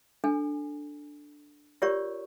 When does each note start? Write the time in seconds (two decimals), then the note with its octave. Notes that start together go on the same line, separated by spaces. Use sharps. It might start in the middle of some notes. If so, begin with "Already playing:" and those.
0.24 D4 A4 G#5
1.82 F4 G4 A#4 C#5 D5 C#6